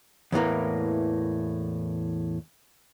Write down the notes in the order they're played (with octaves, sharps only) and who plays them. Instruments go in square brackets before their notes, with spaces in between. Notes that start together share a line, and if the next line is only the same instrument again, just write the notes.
[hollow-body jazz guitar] E2 A2 E3 A#3